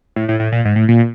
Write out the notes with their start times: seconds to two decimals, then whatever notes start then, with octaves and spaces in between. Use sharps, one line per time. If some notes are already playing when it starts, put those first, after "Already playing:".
0.16 A2
0.29 A2
0.40 A2
0.52 A#2
0.65 G#2
0.76 A2
0.88 A#2